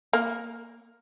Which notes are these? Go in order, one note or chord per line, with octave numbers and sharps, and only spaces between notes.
A#3